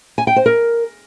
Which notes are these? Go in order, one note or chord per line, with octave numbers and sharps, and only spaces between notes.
G#5
G5
C5
A#4